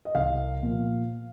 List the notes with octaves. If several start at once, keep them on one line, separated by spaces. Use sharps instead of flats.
D#5
C2 F5
A#2 F3